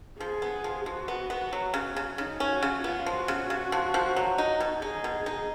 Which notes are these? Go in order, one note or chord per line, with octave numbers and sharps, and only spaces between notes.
F3 G#4
B3
F3
F3 F#4
B3
B3
F#3
C#3
C#3
C#3 D#4
C#4
F#4
C#3
B3 F4
F3
F#4
C#3
C#3
F3
F3
F#3
D#4
B2
D#4 G#4
B2
D#4